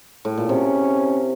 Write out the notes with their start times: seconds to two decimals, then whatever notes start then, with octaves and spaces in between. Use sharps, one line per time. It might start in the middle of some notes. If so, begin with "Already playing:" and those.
0.25 A2
0.38 A#2
0.49 C3 C#4